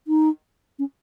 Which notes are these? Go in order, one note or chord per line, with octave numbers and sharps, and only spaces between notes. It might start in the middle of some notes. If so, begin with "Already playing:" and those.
D#4
C#4